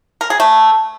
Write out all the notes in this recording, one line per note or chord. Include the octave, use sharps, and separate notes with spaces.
A#4
G#4
A3